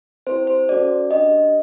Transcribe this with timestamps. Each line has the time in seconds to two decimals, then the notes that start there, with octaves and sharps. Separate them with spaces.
0.27 C4 E4 G4 C5
0.47 C5
0.68 C#4 F#4 A4 D5
1.10 D4 G4 D#5